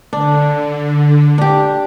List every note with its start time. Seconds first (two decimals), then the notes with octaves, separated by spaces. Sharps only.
0.13 D3 D4
1.38 D4 G4